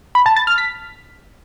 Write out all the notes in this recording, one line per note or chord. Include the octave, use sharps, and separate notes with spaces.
B5
A5
A6
F6
B6